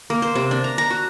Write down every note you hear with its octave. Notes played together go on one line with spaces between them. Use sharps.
A#3
C5
C3
D4
A#5
A#5
F#4